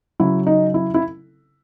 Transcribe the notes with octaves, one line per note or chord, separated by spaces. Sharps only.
C#3 F#3 E4
D#4
E4
E4